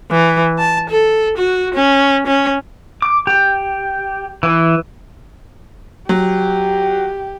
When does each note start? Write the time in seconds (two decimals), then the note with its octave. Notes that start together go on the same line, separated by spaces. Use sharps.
0.11 E3
0.59 A5
0.90 A4
1.37 F#4
1.74 C#4
2.27 C#4
3.02 D6
3.27 G4
4.43 E3
6.09 F#3 G4